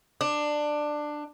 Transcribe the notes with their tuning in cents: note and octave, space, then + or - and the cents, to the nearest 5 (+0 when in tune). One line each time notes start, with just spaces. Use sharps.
D4 +15